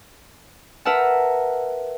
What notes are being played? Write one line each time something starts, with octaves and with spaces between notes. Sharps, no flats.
A#4 B4 E5 F#5 A5